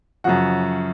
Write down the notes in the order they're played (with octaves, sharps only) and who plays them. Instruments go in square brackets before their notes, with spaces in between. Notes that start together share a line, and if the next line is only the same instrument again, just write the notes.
[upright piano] F#2 C#3 F3 F#4